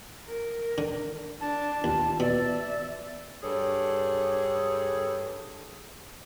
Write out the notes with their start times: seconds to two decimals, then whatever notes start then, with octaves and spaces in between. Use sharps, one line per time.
0.26 A#4
0.78 D3
1.41 D4 A5
1.84 D#2 F4
2.20 B2 D5 E5
3.43 G2 G#4 A4 C#5